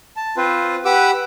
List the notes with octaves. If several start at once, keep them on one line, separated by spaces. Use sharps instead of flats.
A5
C4 F4 B4 C5
G4 B4 F#5 D6 E6